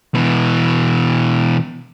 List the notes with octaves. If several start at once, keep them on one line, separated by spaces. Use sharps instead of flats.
B2 E3